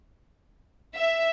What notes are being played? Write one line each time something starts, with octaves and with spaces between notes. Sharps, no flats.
E5